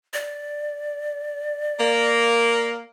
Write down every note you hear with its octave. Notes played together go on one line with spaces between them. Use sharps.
D5
A#3